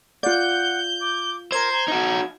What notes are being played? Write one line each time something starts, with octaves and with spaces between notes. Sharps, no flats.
F4 D5 F#5 G6
D6
A#4 C5 G#6
A#5
D#4 F#4